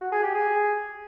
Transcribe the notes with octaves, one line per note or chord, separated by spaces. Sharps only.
F#4
G#4
G4
G#4